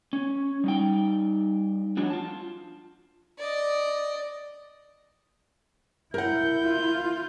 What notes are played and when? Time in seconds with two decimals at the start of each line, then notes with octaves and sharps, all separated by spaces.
0.13 C#4
0.64 G3 D#4 G5
1.97 F3 F#3 G#3 D4 F#4
2.10 F4 A5
3.39 D5 D#5
6.14 E4 A#4 F#5 G6
6.63 F4